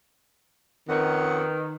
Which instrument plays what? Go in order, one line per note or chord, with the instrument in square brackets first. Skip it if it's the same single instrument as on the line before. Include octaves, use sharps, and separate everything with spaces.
[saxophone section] F2 C#4 F#5 [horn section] D#3 [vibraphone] B4